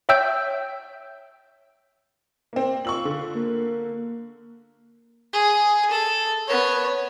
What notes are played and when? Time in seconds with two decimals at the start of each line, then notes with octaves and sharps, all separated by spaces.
0.09 C#5 E5 G5 E6 G6
2.53 A#3 C4
2.85 F4 C#6 E6 F#7
3.05 D3
3.34 A#3
5.33 G#4
5.91 A4
6.48 B3 C#5